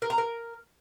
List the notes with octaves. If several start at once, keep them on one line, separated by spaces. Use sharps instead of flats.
A#4
A#5
A#4